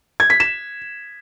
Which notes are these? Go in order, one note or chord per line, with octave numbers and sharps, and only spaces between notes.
G#6
B6
E7